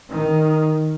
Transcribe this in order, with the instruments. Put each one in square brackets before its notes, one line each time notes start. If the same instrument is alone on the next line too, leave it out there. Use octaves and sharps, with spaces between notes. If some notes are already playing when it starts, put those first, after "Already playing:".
[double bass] D#3